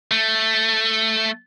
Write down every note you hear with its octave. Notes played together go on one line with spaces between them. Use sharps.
A3